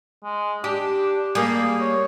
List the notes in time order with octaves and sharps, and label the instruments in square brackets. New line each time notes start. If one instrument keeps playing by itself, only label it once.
[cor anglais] G#3
[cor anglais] D4 [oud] G4
[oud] G3 A#3 [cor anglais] G#4
[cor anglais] C#5